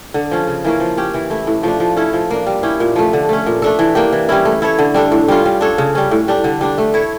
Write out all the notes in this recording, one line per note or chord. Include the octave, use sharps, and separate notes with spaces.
D3
F3 C#4
C#3
E3 A#3 C#4
F3
C#4 G4
E3
A3 E4
A2
F3 A3 D4
F3
C#4 E4 A4
F3
A#3 D4
G3
C#4 E4 G4
A#2
F3 A3
D3
A3 C#4
A#2
A3 D4 A4
E3
A#3 D4 G4
E3
G3 C#4 E4
A3
E4 A4 C#5
D3
G3 D4 A4
A2
G3 C#4 F4
G3
D4 A4 C#5
C#3
G3 C#4
A2
G3 D4
D3
G3 D4
A3
E4 A4 C#5